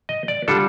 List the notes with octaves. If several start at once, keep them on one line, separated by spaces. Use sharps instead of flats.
D#5
D5
D3 G3 D4 F4 A4